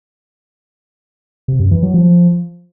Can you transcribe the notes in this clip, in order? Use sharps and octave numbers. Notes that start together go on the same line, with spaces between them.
C3
F#2
E3
F#3
F3